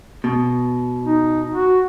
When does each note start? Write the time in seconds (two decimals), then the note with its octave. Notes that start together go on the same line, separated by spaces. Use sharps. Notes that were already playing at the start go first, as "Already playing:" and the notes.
0.24 B2
1.05 D#4
1.51 F#4